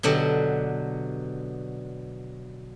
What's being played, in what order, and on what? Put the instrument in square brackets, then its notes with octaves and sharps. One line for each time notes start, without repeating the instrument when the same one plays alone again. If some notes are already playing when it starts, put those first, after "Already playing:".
[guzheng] B2 D3 F#3 G4